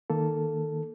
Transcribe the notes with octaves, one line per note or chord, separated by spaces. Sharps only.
D#3 A#3 A4